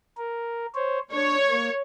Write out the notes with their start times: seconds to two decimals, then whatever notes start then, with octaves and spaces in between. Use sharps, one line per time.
0.18 A#4
0.75 C5 C#5
1.12 D4 C#5
1.50 A#3